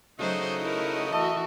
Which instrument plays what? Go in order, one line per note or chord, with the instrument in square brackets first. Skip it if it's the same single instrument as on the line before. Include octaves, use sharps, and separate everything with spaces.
[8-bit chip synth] C#3 A3 D#4 [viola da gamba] F#3 C5 [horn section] F#4 D#5
[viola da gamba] E4 A#4
[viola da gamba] E3 F#4 [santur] A3 [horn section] D#5